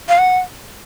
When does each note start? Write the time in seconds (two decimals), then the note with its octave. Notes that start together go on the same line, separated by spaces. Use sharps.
0.09 F5
0.18 F#5